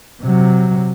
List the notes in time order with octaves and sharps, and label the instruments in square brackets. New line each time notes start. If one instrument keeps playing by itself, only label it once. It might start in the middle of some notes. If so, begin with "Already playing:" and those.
[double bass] C3 F#3